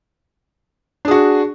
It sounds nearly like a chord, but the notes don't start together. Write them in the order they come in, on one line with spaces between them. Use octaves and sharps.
D4 G#4 F#4